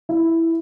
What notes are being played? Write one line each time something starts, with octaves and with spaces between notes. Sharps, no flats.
E4